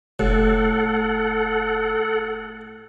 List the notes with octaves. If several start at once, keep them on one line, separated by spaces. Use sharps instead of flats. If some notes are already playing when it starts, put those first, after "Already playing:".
F1 A2 A4 F#5